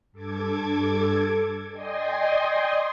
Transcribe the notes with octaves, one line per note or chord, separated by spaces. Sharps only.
G2 A4 D6 G#6
D5 D#5 G5 G#5 C6 D#6